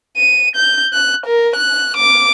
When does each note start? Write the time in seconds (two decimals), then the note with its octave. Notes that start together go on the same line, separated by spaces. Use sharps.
0.17 D#7
0.56 G6
0.93 F#6
1.26 A#4
1.55 F#6
1.97 D6